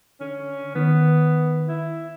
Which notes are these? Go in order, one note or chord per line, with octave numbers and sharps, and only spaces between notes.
D3 C#4
D#3 B3
E4